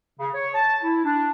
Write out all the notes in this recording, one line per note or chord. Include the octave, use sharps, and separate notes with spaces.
C#3
C#5
A5
E4
D4